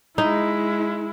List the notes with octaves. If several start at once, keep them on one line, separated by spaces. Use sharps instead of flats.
G#3 D#4 E4